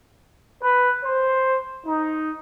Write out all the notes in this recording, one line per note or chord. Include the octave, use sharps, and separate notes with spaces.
B4
C5
D#4